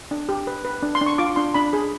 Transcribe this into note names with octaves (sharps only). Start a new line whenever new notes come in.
D4
G4
B4
B4
D4
C6
D4
C#6
F4 D6
D4 C6
D4 B5
G#4